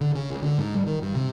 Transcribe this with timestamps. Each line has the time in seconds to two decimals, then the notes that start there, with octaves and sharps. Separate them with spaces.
0.01 D3
0.15 C#3
0.30 C#2
0.42 D3
0.58 G#2
0.75 G3
0.86 D#3
1.02 G2
1.15 C3